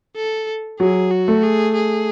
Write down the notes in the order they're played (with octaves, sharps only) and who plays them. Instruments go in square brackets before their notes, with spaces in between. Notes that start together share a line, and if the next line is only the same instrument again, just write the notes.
[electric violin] A4
[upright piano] F#3 [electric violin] G#4
[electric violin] F#4
[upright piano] A3
[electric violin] G#4
G#4